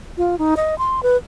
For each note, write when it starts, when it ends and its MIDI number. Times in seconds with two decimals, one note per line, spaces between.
0.17 0.38 65
0.38 0.54 63
0.57 0.77 75
0.78 1.03 84
1.03 1.17 71